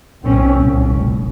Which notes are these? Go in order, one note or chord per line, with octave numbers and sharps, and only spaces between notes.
B1 A#2 C4 C#4
C2
F1